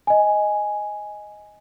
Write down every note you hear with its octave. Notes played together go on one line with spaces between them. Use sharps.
D#5 G#5